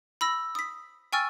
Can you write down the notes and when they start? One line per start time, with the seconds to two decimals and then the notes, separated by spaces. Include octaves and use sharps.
0.21 B5 E6 A#6
0.55 D#6 B6
1.13 G5 G#5 C#6 E6 F6 A6